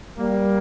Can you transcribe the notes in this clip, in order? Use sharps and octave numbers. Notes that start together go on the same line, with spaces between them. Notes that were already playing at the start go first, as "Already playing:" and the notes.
G3 A#3